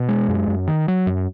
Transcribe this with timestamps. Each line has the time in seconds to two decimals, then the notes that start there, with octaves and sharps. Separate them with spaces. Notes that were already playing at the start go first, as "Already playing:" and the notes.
Already playing: B2
0.09 G#3
0.28 F#2
0.48 F#2
0.67 D#3
0.88 F#3
1.07 F#2